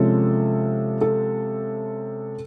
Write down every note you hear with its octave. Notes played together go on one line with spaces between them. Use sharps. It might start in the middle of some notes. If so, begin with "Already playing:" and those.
Already playing: C3 F3 G#3 C#4 A4
A4